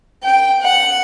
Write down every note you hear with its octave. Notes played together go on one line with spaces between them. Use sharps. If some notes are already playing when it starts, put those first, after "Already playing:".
G5
F#5